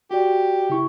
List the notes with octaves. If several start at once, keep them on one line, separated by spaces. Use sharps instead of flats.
F#4 G4 D5
C#3 E4 C#6